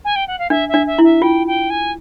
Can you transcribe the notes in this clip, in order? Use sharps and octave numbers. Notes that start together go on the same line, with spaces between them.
G#5
G5
F#5
F5
D4 E5
E5
D4
E5
E4 E5
F4 G5
G5
G#5